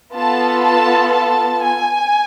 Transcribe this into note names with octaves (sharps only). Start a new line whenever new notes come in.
B3 F4 A4 A5
A5
A5
G#5